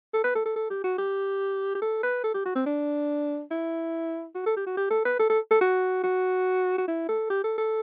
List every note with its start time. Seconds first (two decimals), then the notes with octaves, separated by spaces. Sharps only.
0.14 A4
0.24 B4
0.35 A4
0.46 A4
0.56 A4
0.70 G4
0.84 F#4
0.98 G4
1.75 G4
1.82 A4
2.04 B4
2.24 A4
2.34 G4
2.46 F#4
2.56 C4
2.66 D4
3.51 E4
4.35 F#4
4.46 A4
4.57 G4
4.67 F#4
4.77 G4
4.91 A4
5.05 B4
5.20 A4
5.30 A4
5.51 A4
5.61 F#4
6.04 F#4
6.78 F#4
6.88 E4
7.09 A4
7.30 G4
7.44 A4
7.58 A4